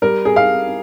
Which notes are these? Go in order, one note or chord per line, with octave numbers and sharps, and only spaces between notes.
G3 A#4
G#4
F5